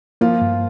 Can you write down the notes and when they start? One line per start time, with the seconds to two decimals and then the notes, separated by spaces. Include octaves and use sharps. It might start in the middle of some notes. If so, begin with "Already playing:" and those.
0.21 F3 A#3 F4
0.41 G2